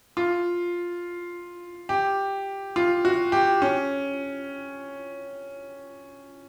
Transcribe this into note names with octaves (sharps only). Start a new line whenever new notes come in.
F4
G4
F4
F#4
G4
C#4